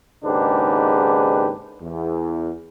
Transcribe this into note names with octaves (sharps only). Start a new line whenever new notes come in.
D#2 G#2 C#3 D4 G4 B4
E2